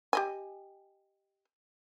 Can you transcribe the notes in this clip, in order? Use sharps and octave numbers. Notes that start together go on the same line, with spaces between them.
G4 D#5 G#5